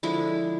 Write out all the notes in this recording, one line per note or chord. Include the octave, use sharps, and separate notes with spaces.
D3 F3 G#3 E4